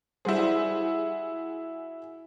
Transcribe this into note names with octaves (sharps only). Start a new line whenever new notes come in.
G3 E4 F#4 G#4 C5